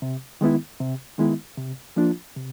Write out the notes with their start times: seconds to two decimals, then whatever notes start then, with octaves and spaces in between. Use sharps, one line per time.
0.02 C3
0.41 D#3 G#3 B3 E4
0.80 C3
1.18 D#3 G#3 B3 E4
1.58 C3
1.96 F3 A#3 D4 F4
2.36 C3